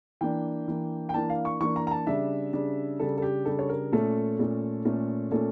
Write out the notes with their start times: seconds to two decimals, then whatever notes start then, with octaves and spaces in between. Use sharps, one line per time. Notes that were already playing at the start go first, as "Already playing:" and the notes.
0.21 E3 A#3 D4 G5
0.68 E3 A#3 D4
1.09 G5
1.14 E3 A#3 D4 A5
1.30 F5
1.45 C#6
1.61 E3 A#3 D4 C#6
1.76 A#5
1.87 A#5
1.91 A5
2.07 C#3 G3 D4 E5
2.53 C#3 G3 D4
3.00 C#3 G3 D4 A4
3.18 A4
3.22 G4
3.45 C#3 G3 D4 A4
3.59 C#5
3.69 A#4
3.92 A#2 A3 C#4 A4
4.39 A#2 A3 C#4
4.85 A#2 A3 C#4
5.31 A#2 A3 C#4 A4